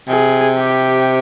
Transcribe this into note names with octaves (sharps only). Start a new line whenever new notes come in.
C3 G#4
G4